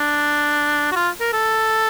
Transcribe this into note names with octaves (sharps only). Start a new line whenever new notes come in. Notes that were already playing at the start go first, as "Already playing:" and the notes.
Already playing: D4
F#4
F4
A#4
A4